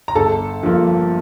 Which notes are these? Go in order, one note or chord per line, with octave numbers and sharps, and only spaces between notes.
A#5
G1 A4 A5
G2 F3 A#3